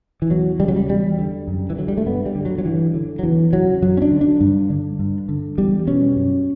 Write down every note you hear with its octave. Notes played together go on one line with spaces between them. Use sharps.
E3
E2 F#3
C#3 G3
F#3
G3
E2 G3
D3
F#2
E3
D3 F#3
G3
A3
G2 B3
G3
D3
F#3
F#3
G2 E3
D3
F#3
E2 E3
C#3 F#3
F#2 F#3
C#4
D4
D3
D4
G2
D3
G2
D3
E2 G3
B2 C#4
F#2